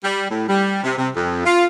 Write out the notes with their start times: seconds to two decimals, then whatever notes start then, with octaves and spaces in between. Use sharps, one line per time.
0.04 G3
0.30 A2
0.48 G3
0.84 C3
0.97 C3
1.16 F2
1.45 F4